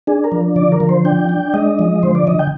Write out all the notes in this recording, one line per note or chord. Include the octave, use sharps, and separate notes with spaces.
D4 G#4
A#4
F3
D3 D5
A#4
F3
C5
D4 G5
D4
G#3 D#5
F3
D3 C5
D5
D3 D#5
G5